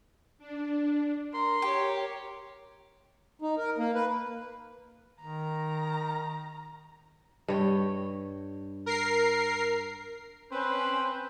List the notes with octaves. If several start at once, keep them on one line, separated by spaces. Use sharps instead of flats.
D4
A#4 C6
G4 A#4 C#5 G5
D#4
A#4
A#3
B4
D#3 A#5
G2 C#5 G5
A#4 C7
C4 C#4 B4 C5